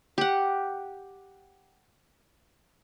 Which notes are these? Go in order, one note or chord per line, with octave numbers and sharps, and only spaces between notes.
G4 F#5